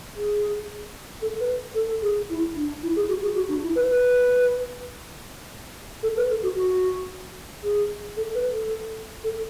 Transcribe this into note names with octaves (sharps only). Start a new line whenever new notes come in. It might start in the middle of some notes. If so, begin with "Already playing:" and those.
G#4
A4
B4
A4
G#4
E4
D4
E4
G#4
F#4
G#4
F#4
D4
E4
B4
B4
A4
B4
A4
F#4
F#4
G#4
A4
B4
A4
A4